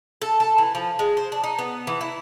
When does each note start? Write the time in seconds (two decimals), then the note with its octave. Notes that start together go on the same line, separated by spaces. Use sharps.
0.22 A4
0.40 A4
0.58 E3
0.75 F3
0.99 G#3
1.17 C5
1.32 D4
1.43 D#4
1.59 B3
1.87 E3
2.01 E4